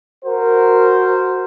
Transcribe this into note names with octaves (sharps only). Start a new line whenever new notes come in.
F#4 A#4 C5